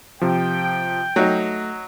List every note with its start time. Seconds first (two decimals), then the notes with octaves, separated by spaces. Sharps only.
0.21 C3 F3 G5
1.16 F#3 A3 D#4